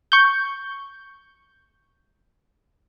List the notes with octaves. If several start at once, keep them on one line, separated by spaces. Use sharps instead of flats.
C#6 G6